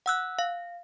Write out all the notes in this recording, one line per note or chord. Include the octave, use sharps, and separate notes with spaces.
F#5 E6 F#6
F5